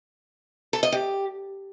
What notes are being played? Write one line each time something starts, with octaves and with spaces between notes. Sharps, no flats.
A4
D#5
G4